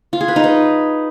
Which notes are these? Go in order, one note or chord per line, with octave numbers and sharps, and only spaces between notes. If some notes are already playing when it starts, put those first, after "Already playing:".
F4
G#4
B4
D#4
B4